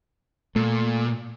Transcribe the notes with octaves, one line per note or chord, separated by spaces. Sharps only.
A#2 A3